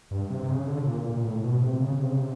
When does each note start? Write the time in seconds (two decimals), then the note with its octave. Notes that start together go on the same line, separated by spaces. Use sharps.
0.11 G2
0.30 C3
0.43 C3
0.49 C#3
0.67 D3
0.86 A#2
1.05 A#2
1.17 A#2
1.24 A2
1.43 B2
1.62 C3
1.80 C#3
1.98 C3
2.09 C#3
2.18 C3